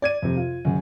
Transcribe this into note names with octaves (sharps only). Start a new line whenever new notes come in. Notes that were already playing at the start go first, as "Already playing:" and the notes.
D5 G#6 D#7
F2 C3
F4
F#1 F#2